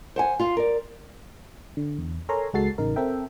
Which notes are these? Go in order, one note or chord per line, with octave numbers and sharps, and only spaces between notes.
C5 F#5 G#5
F4 F5
A#4 D5
D3
E2
A4 A#4 C#5 G#5 A#5 C6
C#2 G#3 F#4 A4 A6 C7
A1 C#3 D#4 A#4
C4 A4 A#4 E5 G5